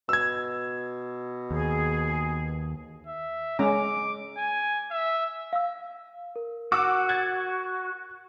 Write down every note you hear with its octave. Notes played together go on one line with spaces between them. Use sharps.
B2 E6 G#6
D#2 G#4
E5
G#3 C#4 A#5 D6
G#5
E5
F5 E6
A#4
F#4 F#5 D6 E6
F#6 G#6 A6